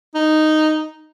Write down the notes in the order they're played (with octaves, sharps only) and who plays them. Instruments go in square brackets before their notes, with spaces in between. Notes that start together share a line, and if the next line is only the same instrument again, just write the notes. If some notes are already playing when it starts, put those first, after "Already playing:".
[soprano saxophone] D#4